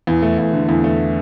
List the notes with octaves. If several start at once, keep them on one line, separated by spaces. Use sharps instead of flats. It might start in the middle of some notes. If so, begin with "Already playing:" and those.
E2
A3
E2
D3
E2
A3